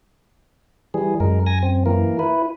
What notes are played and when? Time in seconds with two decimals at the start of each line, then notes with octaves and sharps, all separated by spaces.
0.94 E3 G3 G#4
1.20 F#2 G#3 A#4
1.46 G#5 A#6
1.62 C4
1.86 E3 A#3 A#4
2.19 E4 B4